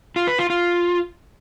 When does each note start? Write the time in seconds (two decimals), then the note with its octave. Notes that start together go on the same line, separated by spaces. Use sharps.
0.16 F4
0.27 B4
0.39 F4
0.50 F4